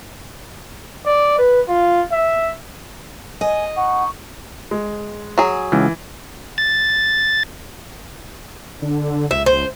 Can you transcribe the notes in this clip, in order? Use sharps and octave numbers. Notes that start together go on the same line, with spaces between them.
D5
B4
F4
E5
D#5 G#5
D#4 F#5 C#6
G#3
F#3 G#4
C#2 E3
A6
D3
C#2 E5
C5